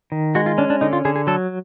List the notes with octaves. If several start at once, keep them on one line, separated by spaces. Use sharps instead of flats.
D#3
G#3 F#4
F4
C#4 D4
D4
D3 D#4
F4
D3 G#4
G#4
F#3 A4